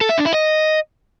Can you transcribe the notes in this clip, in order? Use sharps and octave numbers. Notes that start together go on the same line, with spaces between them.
A4
E5
D4
E4
D#5